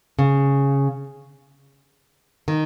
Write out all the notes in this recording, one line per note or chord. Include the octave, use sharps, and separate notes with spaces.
C#3
D#3